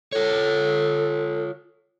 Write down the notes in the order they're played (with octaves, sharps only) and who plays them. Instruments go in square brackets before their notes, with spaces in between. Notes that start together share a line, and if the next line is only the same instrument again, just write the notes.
[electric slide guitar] F4 C#5 [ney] A4